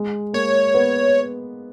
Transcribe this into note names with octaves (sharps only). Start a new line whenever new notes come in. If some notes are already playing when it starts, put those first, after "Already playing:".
Already playing: G#3
A#3 C#5
B3